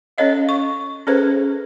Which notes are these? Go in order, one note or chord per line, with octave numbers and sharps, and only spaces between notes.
C#4 A4 C#5 D#5 F5
C#6
C#4 G#4 A4 B4 C5